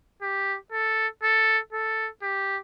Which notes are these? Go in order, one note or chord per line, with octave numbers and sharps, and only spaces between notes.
G4
A4
A4
A4
G4